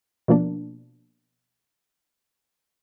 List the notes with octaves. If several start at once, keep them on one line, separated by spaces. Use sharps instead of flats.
B2 F3 A#3 D4